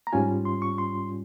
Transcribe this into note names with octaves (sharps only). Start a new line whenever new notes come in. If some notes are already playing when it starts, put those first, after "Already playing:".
A#5
G#2 G3 C#4 F4 G#5
C6
C#6
C6